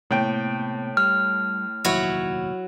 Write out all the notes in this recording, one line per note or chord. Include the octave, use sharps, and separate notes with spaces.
A2 C3 A#3 B3 G5
G3 F6
F1 A#1 D#2 F#3 E4 C#5